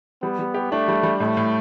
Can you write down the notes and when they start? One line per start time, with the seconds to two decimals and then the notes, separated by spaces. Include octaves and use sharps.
0.22 G3 B3
0.39 G3
0.54 G4
0.71 A3 D4
0.88 G3
1.03 G3
1.20 A2 A3
1.37 A2